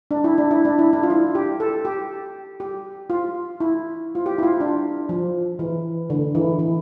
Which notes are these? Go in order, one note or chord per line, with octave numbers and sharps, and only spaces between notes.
D4
E4
D4
E4
D4
E4
D4
F4
E4
G4
A4
G4
G4
F4
E4
F4
G4
E4
F4
D4
F3
E3
D3
E3
E3